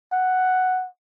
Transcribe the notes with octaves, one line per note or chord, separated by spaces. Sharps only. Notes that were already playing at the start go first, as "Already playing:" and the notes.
F#5